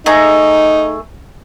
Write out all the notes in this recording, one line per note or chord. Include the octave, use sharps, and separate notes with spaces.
A3 D#4 G#4 A#5